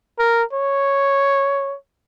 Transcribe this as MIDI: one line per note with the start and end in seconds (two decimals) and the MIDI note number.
0.19 0.44 70
0.53 1.76 73